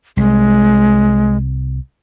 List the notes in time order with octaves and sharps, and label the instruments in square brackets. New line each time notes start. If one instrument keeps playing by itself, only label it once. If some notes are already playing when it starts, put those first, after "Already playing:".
[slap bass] C2 [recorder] G#3